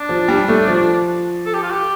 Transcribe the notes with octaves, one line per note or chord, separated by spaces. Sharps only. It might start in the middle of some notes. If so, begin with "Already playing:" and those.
Already playing: D4
F3
G3
A3
F3
A4
G4
F4
G4